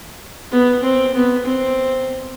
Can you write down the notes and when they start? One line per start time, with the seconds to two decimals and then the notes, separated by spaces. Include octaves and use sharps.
0.51 B3
0.83 C4
1.14 B3
1.45 C4